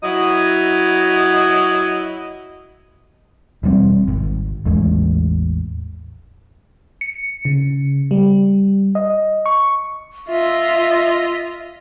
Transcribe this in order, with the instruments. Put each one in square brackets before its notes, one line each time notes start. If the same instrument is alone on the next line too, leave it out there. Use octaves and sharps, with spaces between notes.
[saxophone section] F#3 E4 D#5
[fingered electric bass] E1 G3 C4
G#1
A1 E2 G#3
[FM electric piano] C#7
C#3
G3
D#5
C#6
[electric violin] F4 D#5 [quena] E5